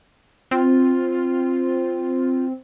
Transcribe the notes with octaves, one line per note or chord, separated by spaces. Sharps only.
C4 F4